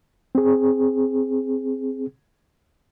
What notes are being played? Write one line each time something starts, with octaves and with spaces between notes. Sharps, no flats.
C4 G#4